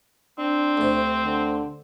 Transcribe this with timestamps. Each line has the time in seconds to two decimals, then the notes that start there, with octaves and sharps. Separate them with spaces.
0.39 C4 D4
0.77 D2 C3
1.25 D3